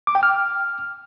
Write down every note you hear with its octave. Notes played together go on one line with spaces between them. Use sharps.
D6
G5
F6